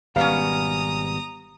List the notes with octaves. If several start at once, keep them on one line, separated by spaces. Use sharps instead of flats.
G#1 B2 G3 B3 C#4 F5 A#5 D#6